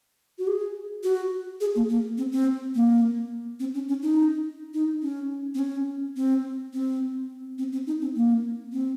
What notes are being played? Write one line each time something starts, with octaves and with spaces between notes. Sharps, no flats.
F#4
G#4
F#4
G#4
A#3
A#3
C4
C4
A#3
C4
C#4
C#4
D#4
D#4
C#4
C4
C#4
C4
C4
C4
C4
D#4
C4
A#3
C4